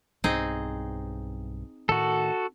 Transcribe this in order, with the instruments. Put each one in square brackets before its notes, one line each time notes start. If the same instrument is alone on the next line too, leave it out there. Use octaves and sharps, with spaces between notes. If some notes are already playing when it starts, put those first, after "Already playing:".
[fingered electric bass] B1 G2 [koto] C4 D#4 G#4
[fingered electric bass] A2 D#3 [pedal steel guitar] F#4 A4